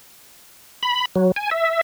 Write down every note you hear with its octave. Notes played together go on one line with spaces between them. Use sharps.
B5
F#3
G#5
E5